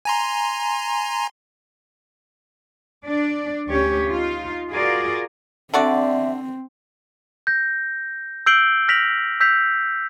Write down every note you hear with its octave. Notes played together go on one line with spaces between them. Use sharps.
G#5 A#5 C6
D4 D5
D2 C#4 G4 C#5
D#4 F4
F4 F#4 G#4 A#4 D5
D3 C4 F#4 D5 E5
G6 A#6
E6 G6 C7 D7 F#7 G7
F6 A#6 B6 D7 F7 F#7
E6 G6 B6 C7 F7